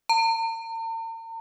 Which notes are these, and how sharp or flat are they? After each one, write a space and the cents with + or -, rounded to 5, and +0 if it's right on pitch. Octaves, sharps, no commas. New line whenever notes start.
A#5 -45